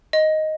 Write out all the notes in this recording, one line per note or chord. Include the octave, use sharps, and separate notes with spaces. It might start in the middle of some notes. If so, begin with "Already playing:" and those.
D#5